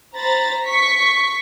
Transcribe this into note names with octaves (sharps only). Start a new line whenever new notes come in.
C5 A#5 B5 A6
C#6 B6 C#7